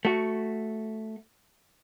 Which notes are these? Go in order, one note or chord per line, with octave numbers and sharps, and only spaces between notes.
A3 F#4